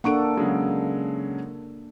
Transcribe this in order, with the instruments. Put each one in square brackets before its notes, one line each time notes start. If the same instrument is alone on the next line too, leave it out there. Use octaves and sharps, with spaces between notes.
[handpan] A#3 D4 A4 [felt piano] F#5 C#6 D7
[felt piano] C#3 F#3 G#3